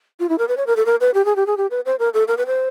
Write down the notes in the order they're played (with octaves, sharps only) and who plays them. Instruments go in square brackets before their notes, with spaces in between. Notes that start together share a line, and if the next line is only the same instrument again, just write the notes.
[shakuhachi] F4
E4
A#4
B4
C#5
A#4
A4
A#4
B4
G4
G#4
G4
G#4
G4
B4
C5
A#4
A4
A#4
B4
C5